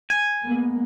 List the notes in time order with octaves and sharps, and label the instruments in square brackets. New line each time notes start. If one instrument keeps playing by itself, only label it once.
[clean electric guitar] G#5
[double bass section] G#3 A#3 B3